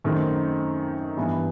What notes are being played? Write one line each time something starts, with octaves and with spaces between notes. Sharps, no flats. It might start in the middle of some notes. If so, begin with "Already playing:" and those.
F#2 D#3 A3 C4 D#4
G2 E3 B3